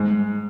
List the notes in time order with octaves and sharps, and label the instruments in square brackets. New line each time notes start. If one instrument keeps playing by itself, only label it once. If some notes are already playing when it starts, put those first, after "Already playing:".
Already playing: [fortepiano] G#2